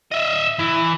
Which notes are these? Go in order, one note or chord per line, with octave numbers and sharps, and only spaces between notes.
D#5 E5
E3